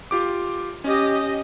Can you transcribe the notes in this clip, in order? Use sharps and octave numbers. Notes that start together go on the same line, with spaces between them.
F4 G4 D6
C#4 G4 D#5